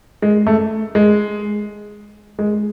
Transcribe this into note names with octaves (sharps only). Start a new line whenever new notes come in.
G#3
A3
G#3
G#3